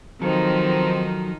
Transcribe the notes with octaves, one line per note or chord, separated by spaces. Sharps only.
D#3 F3 F#3 C4 D#4 A4